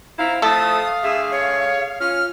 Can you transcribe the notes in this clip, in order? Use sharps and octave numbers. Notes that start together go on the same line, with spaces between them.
C4 E4 F5 A#5
F3 A3 A4 F5 D#6
D3 A3 G#4 E5
C#5
C#4 F4 F6